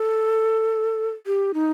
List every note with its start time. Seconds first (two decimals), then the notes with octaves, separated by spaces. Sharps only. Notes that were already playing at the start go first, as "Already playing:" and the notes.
Already playing: A4
1.27 G4
1.54 D#4